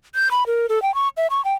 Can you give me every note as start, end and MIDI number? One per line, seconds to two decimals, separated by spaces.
0.15 0.31 91
0.31 0.46 83
0.47 0.66 70
0.69 0.82 69
0.82 0.94 79
0.95 1.08 85
1.17 1.27 76
1.30 1.44 85
1.45 1.54 79